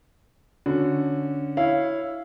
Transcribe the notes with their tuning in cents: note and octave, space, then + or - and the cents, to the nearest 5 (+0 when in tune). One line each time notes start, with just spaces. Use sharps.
D3 +0 C#4 +0 F#4 -15
E4 +0 C#5 +0 F5 -10